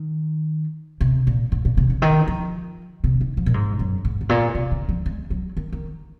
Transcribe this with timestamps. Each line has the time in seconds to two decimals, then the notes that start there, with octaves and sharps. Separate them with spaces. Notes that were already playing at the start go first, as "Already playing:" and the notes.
Already playing: D#3
1.01 C3
1.27 A#2
1.52 G#2
1.65 A#2
1.77 C3
1.90 C#3
2.02 D#3
2.27 F3
3.04 C3
3.21 D#3
3.37 F3
3.46 A#2
3.54 G#2
3.79 F#2
4.05 G#2
4.21 G#2
4.29 A#2
4.55 C3
4.71 C#3
4.89 F3
5.06 G#3
5.30 F#3
5.57 D#3
5.72 D#3